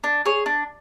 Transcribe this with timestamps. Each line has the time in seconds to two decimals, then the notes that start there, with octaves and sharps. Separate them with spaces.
0.04 D4
0.26 G#4 C#5
0.46 D4